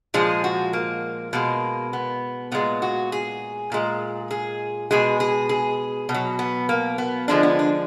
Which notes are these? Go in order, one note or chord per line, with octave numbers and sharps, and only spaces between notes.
A#2 F3 G#3 G#4
F#4
A#3
B2 G#3 A#3
B3
A#2 G#3 B3
F#4
G#4
A#2 G#3
G#4
B2 G#3 G#4
G#4
G#4
B2
F#3
B3
A#3
B3
D3 F3 G#3 D4
B3
D4